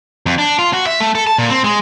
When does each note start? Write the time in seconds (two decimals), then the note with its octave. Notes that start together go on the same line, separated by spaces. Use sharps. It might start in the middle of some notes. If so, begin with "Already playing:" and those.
0.26 F2
0.38 D4
0.59 F4
0.73 F#4
0.87 E5
1.00 A3
1.15 A4
1.27 A5
1.38 A#2
1.50 C4
1.64 G#3